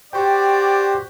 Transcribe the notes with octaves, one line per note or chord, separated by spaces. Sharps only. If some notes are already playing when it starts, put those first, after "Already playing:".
F#4 G4 C5 D5 G5 C#6